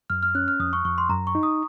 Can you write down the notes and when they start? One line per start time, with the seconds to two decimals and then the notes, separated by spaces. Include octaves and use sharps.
0.10 F#2 F6
0.23 F6
0.35 C#4 F#6
0.48 F6
0.60 F2 D#6
0.73 C#6
0.85 F2 C#6
0.98 C6
1.10 F#2 A#5
1.27 C#6
1.35 D#4
1.43 D#6